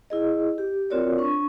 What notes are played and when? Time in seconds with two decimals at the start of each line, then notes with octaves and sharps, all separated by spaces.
0.10 E4 G#4 D#5
0.58 G4
0.90 C4 F4 F#4 A#4 C#5 D5
1.18 D4 C#6